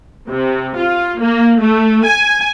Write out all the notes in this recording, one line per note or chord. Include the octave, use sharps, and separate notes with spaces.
C3
F4
A#3
A3
G#5